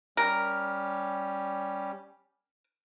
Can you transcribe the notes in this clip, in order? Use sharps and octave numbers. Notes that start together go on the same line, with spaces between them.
G3 C#4 G4 A#4